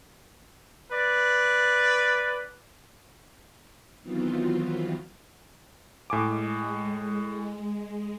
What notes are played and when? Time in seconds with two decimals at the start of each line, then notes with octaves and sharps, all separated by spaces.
0.91 B4 D5
4.03 D#3 E3 F#3 B3 C4 F4
6.10 A2 G#3 G#5 D6